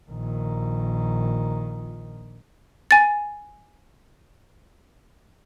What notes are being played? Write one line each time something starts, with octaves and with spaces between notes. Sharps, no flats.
A#1 D#3
G#5 A6